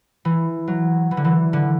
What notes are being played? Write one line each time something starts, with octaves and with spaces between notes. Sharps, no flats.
E3
F#3
E3
D3
E3
D3